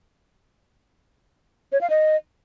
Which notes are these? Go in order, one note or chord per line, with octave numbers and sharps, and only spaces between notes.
C#5
F5
D#5